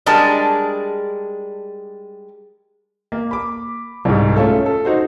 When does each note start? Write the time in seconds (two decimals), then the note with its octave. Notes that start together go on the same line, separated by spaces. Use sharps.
0.06 G3 G#3 D4 G#4 A#4 A5
3.12 A#3
3.31 B5 D6
4.05 C2 G#2
4.36 A3 C#4 F4 A4
4.66 A4
4.85 D#4 F#4 C5